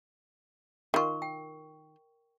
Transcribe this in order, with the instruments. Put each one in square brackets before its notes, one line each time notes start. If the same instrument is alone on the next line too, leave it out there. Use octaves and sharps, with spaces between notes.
[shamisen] D#3 F4 [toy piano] A#4 C#6
[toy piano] G5